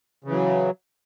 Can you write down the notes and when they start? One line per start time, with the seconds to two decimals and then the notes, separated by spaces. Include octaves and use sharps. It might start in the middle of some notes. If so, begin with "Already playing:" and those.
0.24 C#3
0.28 E3
0.31 F#3